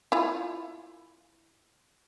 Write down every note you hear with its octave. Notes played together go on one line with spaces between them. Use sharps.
E4 F4